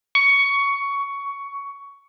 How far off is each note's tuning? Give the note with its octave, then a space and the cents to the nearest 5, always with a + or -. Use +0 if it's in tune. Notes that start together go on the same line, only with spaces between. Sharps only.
C#6 +15